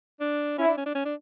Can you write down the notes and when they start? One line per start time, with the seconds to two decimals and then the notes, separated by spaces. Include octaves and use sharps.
0.20 D4
0.58 C#4 E4
0.68 D4
0.77 C#4
0.86 D4
0.95 C#4
1.05 D4